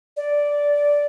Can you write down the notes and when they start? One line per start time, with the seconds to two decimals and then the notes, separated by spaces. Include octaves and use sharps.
0.17 D5